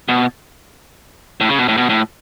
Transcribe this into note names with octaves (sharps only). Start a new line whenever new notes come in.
B2
A2
C#3
B2
A2
B2
A2